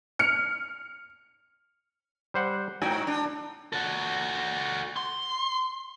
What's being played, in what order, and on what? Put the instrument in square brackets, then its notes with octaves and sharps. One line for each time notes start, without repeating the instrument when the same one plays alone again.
[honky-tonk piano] F6 C#7
[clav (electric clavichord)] G3 C5 F#5
[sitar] G#2 D#4 F#4 [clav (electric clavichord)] G5 G#5
[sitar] D4
[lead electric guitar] F#4 A4
C6